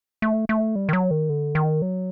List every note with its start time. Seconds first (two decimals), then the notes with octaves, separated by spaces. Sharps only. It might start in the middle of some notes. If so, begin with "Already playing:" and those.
0.22 A3
0.49 A3
0.76 G3
0.89 D#3
0.93 F#3
1.11 D#3
1.29 D3
1.55 D#3
1.82 F#3